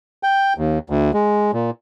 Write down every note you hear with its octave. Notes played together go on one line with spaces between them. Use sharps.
G5
D#2
D2
G#3
A#2